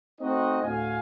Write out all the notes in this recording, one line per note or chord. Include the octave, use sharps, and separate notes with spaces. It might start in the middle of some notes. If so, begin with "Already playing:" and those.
A3 C4 D#4 F#4 D#5
D2 A2 F#4 F5 G#5